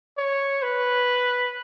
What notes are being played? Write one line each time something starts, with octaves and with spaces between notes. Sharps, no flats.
C#5
B4